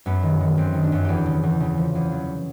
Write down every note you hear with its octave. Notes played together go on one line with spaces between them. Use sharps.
F#2 B3
D#3
D#3
F#2 C4
D#3
D4
F#2
E2 G4 G#4
C#3
E2
C#3
F3
E2
F#3